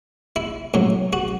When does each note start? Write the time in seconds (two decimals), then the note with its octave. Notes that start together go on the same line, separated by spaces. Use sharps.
0.36 E4
0.74 A2 F#3
1.13 F#4